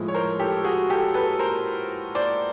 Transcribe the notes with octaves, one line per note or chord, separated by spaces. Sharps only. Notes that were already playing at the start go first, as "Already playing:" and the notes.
Already playing: A2 F3 G#3
C#5
A#4 C5
G4 A4
F#4 G#4
G4 A4
A4 B4
A#4 C5
C5 D5